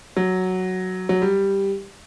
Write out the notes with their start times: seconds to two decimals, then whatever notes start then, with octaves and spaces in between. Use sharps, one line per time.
0.17 F#3
1.09 F#3
1.22 G3